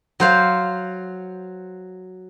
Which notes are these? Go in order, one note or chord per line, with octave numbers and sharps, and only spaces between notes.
F#3 C5 F5